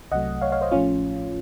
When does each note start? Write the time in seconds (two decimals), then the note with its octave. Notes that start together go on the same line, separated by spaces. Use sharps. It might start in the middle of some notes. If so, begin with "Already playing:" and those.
0.12 C2 C3 F#3 A3 D#5 F#5
0.41 C#5 F5
0.52 C#5 F5
0.61 C5 D#5
0.71 A1 A2 F3 A3 C#4 F4